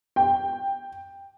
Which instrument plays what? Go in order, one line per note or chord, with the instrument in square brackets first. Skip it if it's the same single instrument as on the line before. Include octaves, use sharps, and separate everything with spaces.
[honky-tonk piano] G5